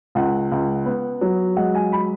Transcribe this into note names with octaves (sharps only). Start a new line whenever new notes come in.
C#2 F#5
C#2
B3
F#3
G#3 F#5
G#5
B5